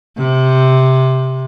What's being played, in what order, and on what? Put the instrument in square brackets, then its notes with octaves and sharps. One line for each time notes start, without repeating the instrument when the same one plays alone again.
[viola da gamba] C3